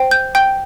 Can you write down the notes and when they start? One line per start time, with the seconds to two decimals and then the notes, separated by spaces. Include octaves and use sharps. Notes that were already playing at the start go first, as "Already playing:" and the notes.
Already playing: C5 G5
0.11 G6
0.35 G5 G6